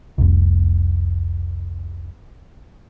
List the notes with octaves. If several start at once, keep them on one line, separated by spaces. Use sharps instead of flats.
F1 C2